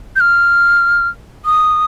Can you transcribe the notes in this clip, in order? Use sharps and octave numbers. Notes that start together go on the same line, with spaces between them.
G6
F6
D#6